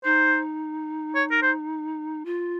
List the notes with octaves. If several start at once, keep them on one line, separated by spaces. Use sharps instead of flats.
D#4 C5
C#5
A#4
C5
F4